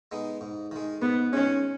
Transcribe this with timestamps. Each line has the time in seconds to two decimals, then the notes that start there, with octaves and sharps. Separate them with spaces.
0.12 G#3 B3 D#4
0.41 G#2
0.71 D#3 G#3
1.02 G#2 B3
1.33 D#3 G#3 C#4